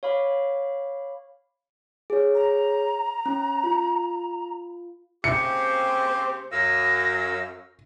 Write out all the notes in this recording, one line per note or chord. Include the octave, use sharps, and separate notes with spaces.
C#5 F5 B5 D6
G#4 C#5
A#5
C#4
F4
C#3 A#3 C4 G4 C#7
F#2 F5 E6 A#6